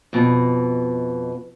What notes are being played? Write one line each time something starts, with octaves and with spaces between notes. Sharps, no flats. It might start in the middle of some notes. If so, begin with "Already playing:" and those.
F2 B2